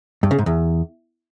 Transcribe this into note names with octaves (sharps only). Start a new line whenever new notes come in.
G2
C#3
G#2
E2